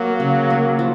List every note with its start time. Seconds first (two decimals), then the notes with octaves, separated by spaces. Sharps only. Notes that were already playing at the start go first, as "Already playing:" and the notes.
Already playing: F#3 A#3
0.20 C#3
0.50 A#3
0.79 F3